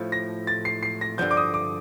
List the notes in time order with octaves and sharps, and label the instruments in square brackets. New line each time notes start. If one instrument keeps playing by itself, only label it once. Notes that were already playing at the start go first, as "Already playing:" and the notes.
Already playing: [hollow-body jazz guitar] A2 F3 A3
[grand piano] A#6
A6
C7
C7
A#6
[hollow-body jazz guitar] G2 D3 F3 [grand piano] G6
[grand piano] D6
D#6
D6